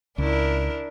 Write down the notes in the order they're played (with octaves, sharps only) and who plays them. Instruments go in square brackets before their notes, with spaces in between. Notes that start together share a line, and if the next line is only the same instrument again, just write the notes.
[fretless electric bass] C#2 [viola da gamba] D4 E4 A#4